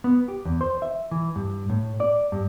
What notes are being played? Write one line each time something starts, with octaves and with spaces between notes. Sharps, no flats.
B3
G4
E2
C5
E5
E3
G2
A2
D5
G2